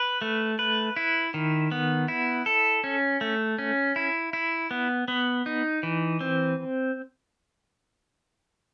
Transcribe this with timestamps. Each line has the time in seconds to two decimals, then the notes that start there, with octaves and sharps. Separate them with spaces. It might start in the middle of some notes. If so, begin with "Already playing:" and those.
Already playing: B4
0.22 A3
0.59 B4
0.97 E4
1.34 D#3
1.71 B3
2.08 E4
2.46 A4
2.84 C#4
3.21 A3
3.58 C#4
3.96 E4
4.33 E4
4.71 B3
5.08 B3
5.46 D#4
5.83 E3
6.21 C4